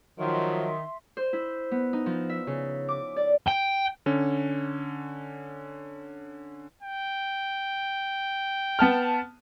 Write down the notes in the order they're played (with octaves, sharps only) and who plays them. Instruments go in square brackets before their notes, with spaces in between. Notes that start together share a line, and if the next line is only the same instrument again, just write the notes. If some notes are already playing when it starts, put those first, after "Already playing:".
[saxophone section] D#3 [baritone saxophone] F3 [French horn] F#3 [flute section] E5 C6
[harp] C5
E4
B3
D#4
F3
E5
C#3
D6
D5
[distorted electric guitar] G5
[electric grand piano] D3 C#4
[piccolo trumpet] G5
[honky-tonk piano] B3 A5 F6